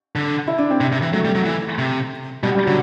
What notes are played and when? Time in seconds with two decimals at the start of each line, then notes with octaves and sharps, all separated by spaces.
0.16 D3
0.48 E4
0.58 D4
0.70 C4
0.81 C3
0.92 C3
1.02 E3
1.13 F#3 A3
1.25 G3
1.35 F#3
1.45 E3
1.78 C3
2.43 B2 G3
2.55 G3
2.65 D3 F#3